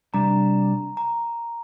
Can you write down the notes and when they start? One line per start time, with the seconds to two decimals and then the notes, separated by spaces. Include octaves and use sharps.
0.14 C3 G3 D4 A#5
0.97 A#5